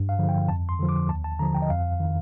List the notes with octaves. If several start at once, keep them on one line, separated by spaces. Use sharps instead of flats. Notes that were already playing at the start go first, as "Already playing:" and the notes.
Already playing: G2
F5
D3 F3
G5
F2 A5
C6
D3 F3
D6
D#2 A5
A5
D3 F3 A#5
G5
D#5
F2 F5
D#3